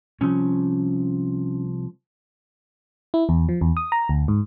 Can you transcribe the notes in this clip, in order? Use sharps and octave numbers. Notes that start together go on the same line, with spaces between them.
C2 F3 C#4
E4
E2
F3
E2
D#6
A#5
D2
G#2